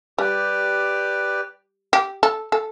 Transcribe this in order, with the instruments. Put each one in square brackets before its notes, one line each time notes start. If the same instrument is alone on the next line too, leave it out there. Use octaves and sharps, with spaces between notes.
[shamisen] G3 [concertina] G4 B4 D5 G5
[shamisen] G4
A4
A4